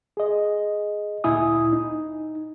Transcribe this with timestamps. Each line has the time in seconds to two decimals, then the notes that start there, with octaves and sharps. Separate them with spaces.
0.17 G#4 D#5
1.24 D2 A#2 E4 G#5 D#6
1.73 D#4